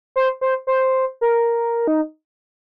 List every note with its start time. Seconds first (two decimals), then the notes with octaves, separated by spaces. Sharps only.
0.16 C5
0.41 C5
0.67 C5
1.21 A#4
1.87 D#4